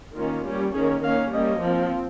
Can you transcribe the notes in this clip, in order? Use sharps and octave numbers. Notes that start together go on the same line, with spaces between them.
D#3 A#3 C#4 F4
G3 A#3 C#4
D#3 A#3 C#4 G#4
D#3 A#3 C#4 F5
G3 A#3 C#4 D#5
F3 C4